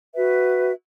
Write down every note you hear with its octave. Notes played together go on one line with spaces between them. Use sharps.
F#4 B4 E5